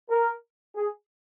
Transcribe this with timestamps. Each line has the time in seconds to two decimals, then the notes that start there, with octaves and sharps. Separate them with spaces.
0.10 A#4
0.76 G#4